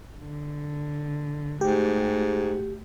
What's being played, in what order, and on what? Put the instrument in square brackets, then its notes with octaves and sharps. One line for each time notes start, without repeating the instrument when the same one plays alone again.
[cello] D3
[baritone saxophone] G#2 [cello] A3 F#4 [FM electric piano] G4